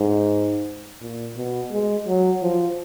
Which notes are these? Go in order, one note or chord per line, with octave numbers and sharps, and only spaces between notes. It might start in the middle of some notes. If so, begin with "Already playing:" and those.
Already playing: G#2
A#2
B2
G#3
F#3
F3